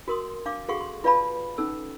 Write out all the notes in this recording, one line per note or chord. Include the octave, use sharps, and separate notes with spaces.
F#4 A#4 C6 D#6
D4 F5 D6
F#4 G#4 A4 F5 F#5 C#6
C6
F4 B4 D5 F5 A5 B5
C#4 D#4 A4 E6